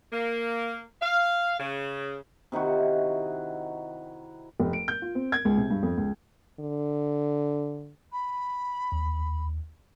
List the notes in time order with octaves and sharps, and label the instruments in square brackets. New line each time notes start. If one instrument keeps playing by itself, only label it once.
[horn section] A#3
F5
C#3
[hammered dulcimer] C3 D#3 E4 F#4
[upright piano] F1
D7
G6
F4
C4
G#6
C#2
C3
G2
F2
C#2
[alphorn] D3
[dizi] B5
[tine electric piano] D#2